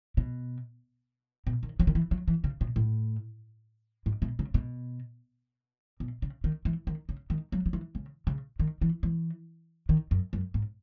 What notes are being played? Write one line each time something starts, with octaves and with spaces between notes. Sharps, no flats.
B2
B2
D#3
F#3
D#3
E3
F#3
E3
C#3
B2
A2
G#2
B2
C#3
B2
B2
C#3
D#3
E3
D#3
C#3
D#3
F#3
F#3
E3
C#3
C#3
D#3
E3
E3
D#3
F#2
F#2
G#2